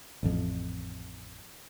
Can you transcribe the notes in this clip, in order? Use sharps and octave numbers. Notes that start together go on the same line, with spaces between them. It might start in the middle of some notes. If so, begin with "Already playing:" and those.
A1 F2